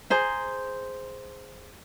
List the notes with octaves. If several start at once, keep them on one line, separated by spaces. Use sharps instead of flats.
G#4 C5 A#5